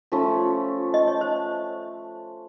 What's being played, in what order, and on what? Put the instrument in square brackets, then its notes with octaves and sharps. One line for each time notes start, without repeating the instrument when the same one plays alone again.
[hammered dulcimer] F3 A3 C#4 [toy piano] F4
[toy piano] D#5
C#5
C5